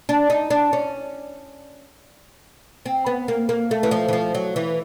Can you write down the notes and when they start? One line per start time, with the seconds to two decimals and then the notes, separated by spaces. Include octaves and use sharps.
0.09 D4
0.30 D#4
0.51 D4
0.73 C#4
2.86 C4
3.06 B3
3.28 A#3
3.49 A#3
3.71 A3
3.83 E3
3.91 F3
4.08 E3
4.13 F3
4.35 F#3
4.56 E3